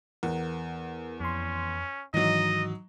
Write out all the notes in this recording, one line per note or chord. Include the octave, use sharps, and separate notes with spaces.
E2 A#4 F#5
F2 C#4 C6
G#2 D#3 E3 F#3 D#4 D#5